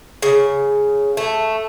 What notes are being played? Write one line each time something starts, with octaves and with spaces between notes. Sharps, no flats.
C#3
A3